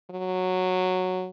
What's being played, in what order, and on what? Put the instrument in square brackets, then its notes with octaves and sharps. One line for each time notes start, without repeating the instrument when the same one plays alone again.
[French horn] F#3